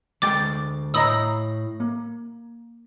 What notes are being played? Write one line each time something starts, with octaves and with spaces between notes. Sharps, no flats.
D2 G#3 G5 D6 A6
A2 D#5 A#5 B5 D#6 E6
A#3